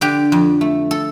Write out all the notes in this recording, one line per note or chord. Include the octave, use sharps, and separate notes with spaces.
D3 G4
F2
A3
A4